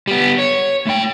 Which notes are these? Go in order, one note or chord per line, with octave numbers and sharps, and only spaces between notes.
G3 B3
C#5
A3 G5